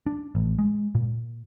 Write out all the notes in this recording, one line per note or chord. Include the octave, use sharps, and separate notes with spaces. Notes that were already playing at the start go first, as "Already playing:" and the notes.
D4
A1
G#3
A#2